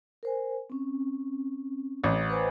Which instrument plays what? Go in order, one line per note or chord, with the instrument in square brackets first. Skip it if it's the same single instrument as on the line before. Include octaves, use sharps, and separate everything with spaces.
[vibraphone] A#4 C5 G#5
C4 C#4
[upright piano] A1
[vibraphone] B4 C5 G#5